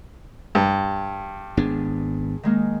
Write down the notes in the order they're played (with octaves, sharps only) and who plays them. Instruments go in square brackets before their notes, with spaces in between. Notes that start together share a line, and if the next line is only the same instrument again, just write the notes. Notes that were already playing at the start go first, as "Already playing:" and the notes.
[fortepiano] G2
[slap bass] G#1 B3 D4 [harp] G#4
[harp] D#3 G#3 A#3